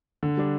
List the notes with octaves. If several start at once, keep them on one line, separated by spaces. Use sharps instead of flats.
D3
G3 D4